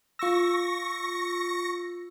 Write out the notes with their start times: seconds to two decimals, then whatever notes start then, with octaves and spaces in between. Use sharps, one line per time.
0.19 F4 C#6 E6 A#6